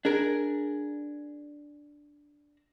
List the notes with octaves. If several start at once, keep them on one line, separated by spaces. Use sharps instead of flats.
D4 G#4 A#4